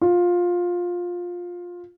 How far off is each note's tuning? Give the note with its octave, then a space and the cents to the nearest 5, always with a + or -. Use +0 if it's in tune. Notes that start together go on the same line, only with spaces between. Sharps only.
F4 +15